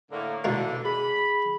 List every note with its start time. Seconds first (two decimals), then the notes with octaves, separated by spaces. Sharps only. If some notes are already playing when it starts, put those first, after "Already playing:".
0.12 A2 D3 A#3
0.44 B2 D3 E3 A#3 D4
0.85 G#4 B5